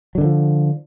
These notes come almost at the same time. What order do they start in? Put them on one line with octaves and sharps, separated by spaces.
F#3 D3 D#3 F3